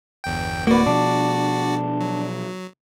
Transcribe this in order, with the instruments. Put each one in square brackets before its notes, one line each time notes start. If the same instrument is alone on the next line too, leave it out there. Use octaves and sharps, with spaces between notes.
[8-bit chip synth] G1 E2 G5
[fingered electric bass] D1 [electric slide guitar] A#3 B4 [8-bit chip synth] F#4 D5
[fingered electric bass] B2 F3 [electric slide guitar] D4
[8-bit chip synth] F#3